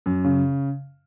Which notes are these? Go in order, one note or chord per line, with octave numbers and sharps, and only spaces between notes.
F#2
C#3